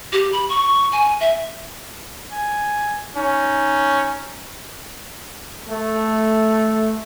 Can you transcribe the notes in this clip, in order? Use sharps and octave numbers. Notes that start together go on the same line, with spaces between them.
G4
B5
C#6
G#5
E5
G#5
C#4 D#4
A3